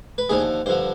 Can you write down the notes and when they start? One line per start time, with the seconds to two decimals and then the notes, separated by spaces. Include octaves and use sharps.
0.18 B4
0.29 D#2 D3 F3 G#4
0.66 G2 D3 F3 C5